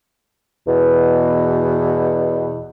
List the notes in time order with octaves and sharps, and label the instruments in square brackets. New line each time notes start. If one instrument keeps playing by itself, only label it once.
[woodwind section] E2 B2